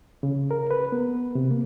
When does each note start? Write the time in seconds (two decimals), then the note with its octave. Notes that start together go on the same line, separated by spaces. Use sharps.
0.23 C#3
0.51 A#4
0.71 B4
0.92 B3
1.35 C3
1.51 A#3